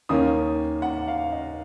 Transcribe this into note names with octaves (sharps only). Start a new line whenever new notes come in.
D#2 D#3 A#3 C#4 D#6
F#5
F5
D#5